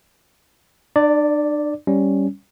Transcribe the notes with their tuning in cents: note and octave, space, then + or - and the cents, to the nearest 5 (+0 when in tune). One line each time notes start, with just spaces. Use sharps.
D4 +40 D5 +0
G3 +0 C#4 +0